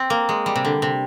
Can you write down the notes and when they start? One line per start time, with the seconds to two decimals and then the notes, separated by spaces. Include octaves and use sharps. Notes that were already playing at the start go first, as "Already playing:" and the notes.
Already playing: C4
0.10 A#3
0.29 G#3
0.46 G3
0.56 C3
0.65 D3
0.82 C3